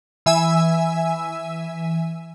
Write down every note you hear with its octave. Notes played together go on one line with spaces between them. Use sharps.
E3 E5 G#5 E6